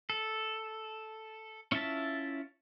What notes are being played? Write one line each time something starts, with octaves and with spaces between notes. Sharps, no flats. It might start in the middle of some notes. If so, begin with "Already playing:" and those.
A4
C#4 E4 F4 E5 A5